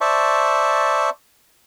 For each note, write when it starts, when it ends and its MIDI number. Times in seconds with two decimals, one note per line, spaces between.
0.01 1.10 72
0.01 1.10 74
0.01 1.10 76
0.01 1.10 81
0.01 1.10 85